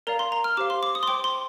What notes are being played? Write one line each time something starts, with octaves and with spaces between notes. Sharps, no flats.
A#4 D5 F5 A#5
C6
A#5
F6
G4 C5 F5 D6
C6
D6
D#6
C6
C5 G5 D6
C6